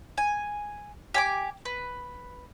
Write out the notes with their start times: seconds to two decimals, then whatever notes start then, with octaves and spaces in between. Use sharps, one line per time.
0.18 G#5
1.14 G4 G#5 D6
1.65 B4